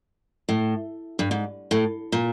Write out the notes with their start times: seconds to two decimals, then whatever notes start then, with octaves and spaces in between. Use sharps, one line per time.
0.49 A2
1.19 G2
1.31 G#2
1.71 A2
2.12 A#2